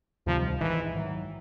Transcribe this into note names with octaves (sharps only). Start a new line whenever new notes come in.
D2 C3 D#3 F3 G3
A#1 G#2 D#3 E3 G#3
G#2 D#3 F#3